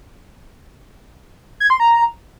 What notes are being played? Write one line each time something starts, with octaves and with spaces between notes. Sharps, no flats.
G#6
C6
A#5